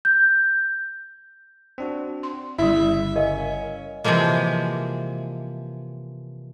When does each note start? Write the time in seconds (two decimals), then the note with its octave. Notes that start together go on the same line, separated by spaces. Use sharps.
0.05 G6
1.78 C4 D4 F#4
2.23 C6
2.59 G1 C#3 G3 E4 E5
3.16 C#4 A#4 D#5 F5
4.04 C3 E3 F3 G#3 A#3